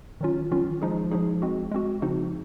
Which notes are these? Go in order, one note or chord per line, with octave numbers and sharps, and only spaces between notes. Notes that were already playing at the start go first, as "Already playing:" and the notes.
D#3 F#3 C#4 F4
D#3 F#3 C#4 F4
F3 G#3 D#4 G#4
F3 G#3 D#4 G#4
G#3 C4 F#4
G#3 C4 F#4
C#3 F3 C4 D#4 F#4